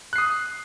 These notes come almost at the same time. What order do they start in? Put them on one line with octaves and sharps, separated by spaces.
F#6 C7 D#6